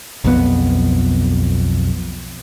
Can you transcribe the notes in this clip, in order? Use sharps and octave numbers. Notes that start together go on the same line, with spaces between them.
B1 F2 B3